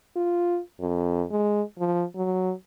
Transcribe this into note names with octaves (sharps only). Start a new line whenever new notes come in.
F4
F2
G#3
F3
F#3